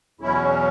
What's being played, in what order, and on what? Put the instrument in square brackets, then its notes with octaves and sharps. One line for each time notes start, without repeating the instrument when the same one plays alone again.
[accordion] E2 B2 F#3 C#4 E4